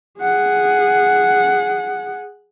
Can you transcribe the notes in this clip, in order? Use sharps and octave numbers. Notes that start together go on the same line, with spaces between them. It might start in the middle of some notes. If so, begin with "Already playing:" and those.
G#4 F#5